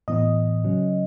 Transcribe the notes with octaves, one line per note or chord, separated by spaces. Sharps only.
A2 E3 B3 D#5
C#3 F#3 C#4